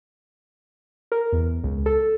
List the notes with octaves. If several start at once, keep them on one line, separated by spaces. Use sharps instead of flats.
A#4
E2
C#2
A4